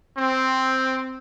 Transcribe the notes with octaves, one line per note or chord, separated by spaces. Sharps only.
C4